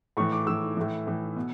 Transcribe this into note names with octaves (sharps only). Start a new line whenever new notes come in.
A2 E3 C#6
D6
A2 E3 E6
A2 E3
A2 E3
B2